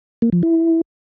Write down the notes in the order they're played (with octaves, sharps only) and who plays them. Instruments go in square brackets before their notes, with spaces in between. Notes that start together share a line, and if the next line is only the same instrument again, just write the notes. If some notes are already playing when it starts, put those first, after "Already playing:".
[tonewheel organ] A#3
F3
E4